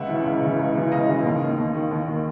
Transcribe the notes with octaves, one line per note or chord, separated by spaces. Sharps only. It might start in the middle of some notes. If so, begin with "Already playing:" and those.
Already playing: C#2 E5 F#5
C#3 E3
C#2
C#3 E3
C#2
C#3 E3
C#2 D#5 F5
C#3 E3
D#2
D#3
D#2
D#3
D#2
D#3